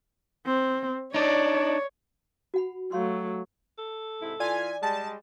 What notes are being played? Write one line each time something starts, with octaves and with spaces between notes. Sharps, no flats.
C4
D4 D#4 C#5 D5
F#4 F#5 B5
F#3 A3 C#5 F5 C6
A4
G#2 C3 E4
E3 F4 D5 G#5
G3 G#3 A5